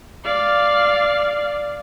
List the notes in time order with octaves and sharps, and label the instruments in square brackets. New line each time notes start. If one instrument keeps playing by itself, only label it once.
[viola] D5 F5